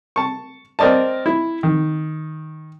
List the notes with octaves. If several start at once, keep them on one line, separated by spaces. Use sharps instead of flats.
A5 C#6
C4 A#4 D5 D#5 A5
E4
D#3